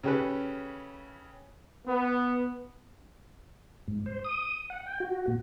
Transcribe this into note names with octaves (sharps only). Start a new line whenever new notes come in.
C#3 C#4 G4 A4 B4
B3
G#2
C5
D#6
F#5
G5
F#4
A#2